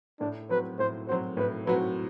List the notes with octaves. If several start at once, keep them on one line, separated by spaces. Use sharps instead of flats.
A2 D4
F#3 C4 F#4 B4
A2 C5
F#3 C4 F#4 C5
A2 B4
F#3 C4 F#4 B4